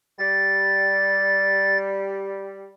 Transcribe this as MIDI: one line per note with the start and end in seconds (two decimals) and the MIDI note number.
0.19 2.72 55
0.19 1.77 93